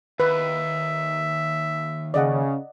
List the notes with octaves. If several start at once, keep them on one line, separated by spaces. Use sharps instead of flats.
D#2 B4 E5
C#3 D5 D#5 F#5